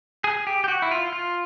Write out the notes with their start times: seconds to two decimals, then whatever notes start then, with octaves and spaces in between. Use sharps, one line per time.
0.24 G#4
0.47 G4
0.64 G4
0.68 F#4
0.82 E4
0.91 F4
1.13 F4